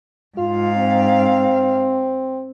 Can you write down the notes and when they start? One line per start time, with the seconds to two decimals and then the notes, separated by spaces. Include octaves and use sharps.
0.37 G#2 F4 F5
0.76 C4